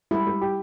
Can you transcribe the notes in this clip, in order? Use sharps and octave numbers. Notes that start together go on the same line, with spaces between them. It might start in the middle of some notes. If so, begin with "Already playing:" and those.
G3 E4
G3
G4